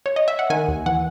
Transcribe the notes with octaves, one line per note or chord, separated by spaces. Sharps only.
C#5
D#5
E5
F#5
D#3 G#5
D#2
E3 F#5